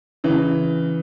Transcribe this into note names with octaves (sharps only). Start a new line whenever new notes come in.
C#3 E3